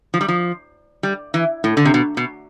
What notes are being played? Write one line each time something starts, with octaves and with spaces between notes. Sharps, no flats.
F3
G3
F3
G3
E3
A2
D3
C3
B2
B2